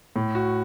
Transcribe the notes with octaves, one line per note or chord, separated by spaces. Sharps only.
A2
F#4